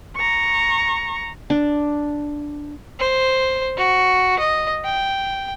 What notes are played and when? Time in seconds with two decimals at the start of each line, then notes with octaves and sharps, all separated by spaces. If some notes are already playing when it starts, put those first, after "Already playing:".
0.16 A#5 C#6
1.50 D4
3.00 C5
3.78 F#4
4.39 D#5
4.85 G5